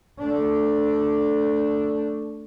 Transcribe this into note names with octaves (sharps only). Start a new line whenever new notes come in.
A3 D4